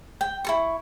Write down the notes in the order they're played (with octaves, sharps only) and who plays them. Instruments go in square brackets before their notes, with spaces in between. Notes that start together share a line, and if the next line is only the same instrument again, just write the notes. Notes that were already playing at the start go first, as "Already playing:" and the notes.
[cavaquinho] G5
E4 A4 C#6